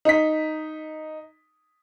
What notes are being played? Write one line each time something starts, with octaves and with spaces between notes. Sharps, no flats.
D#4 B6